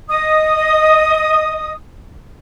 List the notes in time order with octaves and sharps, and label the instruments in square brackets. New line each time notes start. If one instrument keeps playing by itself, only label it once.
[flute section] D#5 D#6